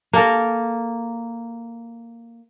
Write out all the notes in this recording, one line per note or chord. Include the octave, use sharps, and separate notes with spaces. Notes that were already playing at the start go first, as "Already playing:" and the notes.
A#3 A4 A#4